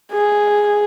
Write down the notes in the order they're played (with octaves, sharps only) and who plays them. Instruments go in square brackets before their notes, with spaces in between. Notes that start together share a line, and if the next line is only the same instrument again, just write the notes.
[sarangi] G#4